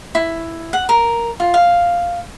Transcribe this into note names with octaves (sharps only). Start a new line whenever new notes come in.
E4
F#5
A#4
F4
F5